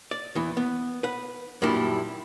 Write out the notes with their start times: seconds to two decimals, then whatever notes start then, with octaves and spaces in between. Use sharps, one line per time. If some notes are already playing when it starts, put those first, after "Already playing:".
0.11 D5
0.35 E2 E3
0.57 B3
1.03 B4 F#5
1.62 F#2 A#2 D#3 G3 D4 E4